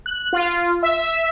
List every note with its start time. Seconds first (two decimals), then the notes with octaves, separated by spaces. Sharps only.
0.06 F#6
0.33 F4
0.83 E5